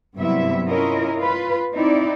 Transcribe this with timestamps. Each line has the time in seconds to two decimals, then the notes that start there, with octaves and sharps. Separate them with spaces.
0.17 G2 C3 F#3 B3 E4 E5
0.66 C#4 E4 F4 A#4 D#5
1.16 F4 B4
1.73 C4 D#4 E4 D5